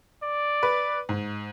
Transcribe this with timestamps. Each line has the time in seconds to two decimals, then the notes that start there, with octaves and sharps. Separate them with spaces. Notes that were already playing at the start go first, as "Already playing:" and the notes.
0.23 D5
0.63 B4
1.09 G#2